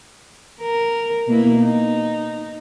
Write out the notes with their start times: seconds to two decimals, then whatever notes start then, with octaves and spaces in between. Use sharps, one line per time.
0.61 A#4
1.27 B2 A#3 E4
1.59 D#4